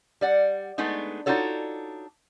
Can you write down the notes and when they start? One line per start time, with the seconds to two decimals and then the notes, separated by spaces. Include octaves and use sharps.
0.21 G3 D5 F#5
0.78 G#3 A3 B3 D4 D#4
1.26 D4 D#4 F4 F#4 A4 C#5